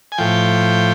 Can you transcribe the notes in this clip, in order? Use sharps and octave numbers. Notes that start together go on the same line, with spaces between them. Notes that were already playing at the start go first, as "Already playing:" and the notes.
G#5
A2 F3 G5